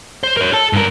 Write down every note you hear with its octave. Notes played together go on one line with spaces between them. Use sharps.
C5
A#4 C#5
A4 A5
G2 A#4